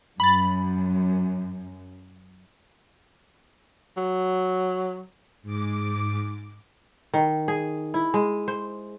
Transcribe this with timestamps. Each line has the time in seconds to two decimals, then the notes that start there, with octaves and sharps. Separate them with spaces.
0.20 F#2 B5 A6
3.97 F#3
5.43 G#2 D6
7.14 D#3
7.48 G#4
7.94 E4
8.14 G#3
8.48 C5